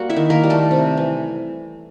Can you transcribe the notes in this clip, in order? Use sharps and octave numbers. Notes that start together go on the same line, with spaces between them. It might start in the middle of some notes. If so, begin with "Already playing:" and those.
Already playing: G3 A#3 F#4 F#5
E4 E5
D#3
A#3 A#4
G3
A3 A4
C3
E3